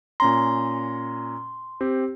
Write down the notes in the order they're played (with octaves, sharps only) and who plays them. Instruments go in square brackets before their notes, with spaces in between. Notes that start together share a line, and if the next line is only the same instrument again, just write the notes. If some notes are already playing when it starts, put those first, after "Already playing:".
[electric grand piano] A#2 C#4 A#5 [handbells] C6
[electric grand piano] C4 G4